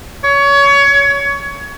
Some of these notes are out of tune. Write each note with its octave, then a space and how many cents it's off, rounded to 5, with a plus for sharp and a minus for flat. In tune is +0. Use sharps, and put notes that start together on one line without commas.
C#5 +25